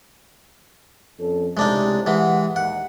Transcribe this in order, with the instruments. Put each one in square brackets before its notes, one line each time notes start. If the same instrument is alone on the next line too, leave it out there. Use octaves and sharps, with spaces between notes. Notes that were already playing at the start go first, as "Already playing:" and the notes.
[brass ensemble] F2 C#4 A4
[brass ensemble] C#2 A2 C3 [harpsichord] G#3 D4 D#4
[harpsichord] E3 G#3 [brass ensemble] G4 F#5
[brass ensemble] D#2 [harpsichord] F#5